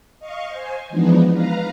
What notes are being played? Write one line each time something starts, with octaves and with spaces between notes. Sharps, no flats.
D#5 F5 C#6
C5 G#5
E3 F3 G#3 B3 D4 D#4
B4 F5 A#5